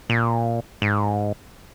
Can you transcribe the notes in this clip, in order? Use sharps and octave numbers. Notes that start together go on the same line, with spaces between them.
A#2
G#2